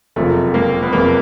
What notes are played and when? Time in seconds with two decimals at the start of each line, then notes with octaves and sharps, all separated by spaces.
0.16 F#1 F2 C3 F3 A3
0.54 A#3
0.83 B3
0.93 F#1 F2 C3 F3 A#3